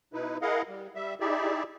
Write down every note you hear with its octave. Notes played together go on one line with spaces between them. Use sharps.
B2 D#4 E4 B4
E4 G#4 A#4 D#5 F5 F#5
G3
G3 E5
D#4 E4 G4 G#4 D5 E5